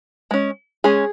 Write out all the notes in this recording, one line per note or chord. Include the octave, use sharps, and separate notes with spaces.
G#3 C#4
G#3 C#4 G#4